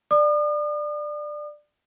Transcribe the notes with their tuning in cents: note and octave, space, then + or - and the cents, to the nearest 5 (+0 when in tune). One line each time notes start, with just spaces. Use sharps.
D5 +15 D#6 -45